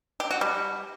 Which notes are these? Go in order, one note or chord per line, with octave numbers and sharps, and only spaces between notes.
G4
F#4
G3